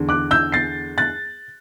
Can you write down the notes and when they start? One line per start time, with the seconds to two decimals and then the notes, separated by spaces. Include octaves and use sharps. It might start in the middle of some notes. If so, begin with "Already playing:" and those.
Already playing: E2 D3
0.09 D6 F#6
0.31 E6 G6
0.52 A6 C7
0.98 F#6 A6